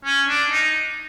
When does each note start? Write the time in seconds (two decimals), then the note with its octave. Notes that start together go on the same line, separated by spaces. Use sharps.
0.05 C#4
0.28 D4
0.51 D#4